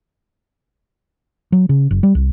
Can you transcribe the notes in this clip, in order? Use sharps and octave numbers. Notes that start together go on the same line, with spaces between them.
F#3
C#3
F#1
G3
C2